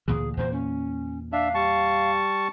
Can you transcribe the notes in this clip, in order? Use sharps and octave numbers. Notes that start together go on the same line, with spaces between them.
D2 A#2 E3 G#4
E2 A#2 A#3 C5
C#4
D4 E5 F5
G3 A5 C#6